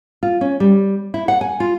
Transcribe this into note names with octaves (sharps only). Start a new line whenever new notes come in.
F4
C#4
G3
E4
F#5
G#5
F4